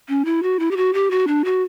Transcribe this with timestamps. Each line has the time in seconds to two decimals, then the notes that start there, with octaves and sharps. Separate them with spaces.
0.09 C#4
0.25 E4
0.43 F#4
0.59 E4
0.71 G4
0.77 F#4
0.94 G4
1.11 F#4
1.28 D4
1.45 F#4